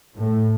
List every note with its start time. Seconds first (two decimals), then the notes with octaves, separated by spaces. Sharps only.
0.16 A2